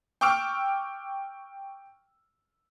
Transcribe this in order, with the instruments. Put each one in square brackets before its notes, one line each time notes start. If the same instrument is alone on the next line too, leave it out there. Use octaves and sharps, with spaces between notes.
[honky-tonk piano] G5 C#6 D6 E6 F6 D7